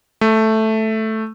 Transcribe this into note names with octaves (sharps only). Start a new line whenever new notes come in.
A3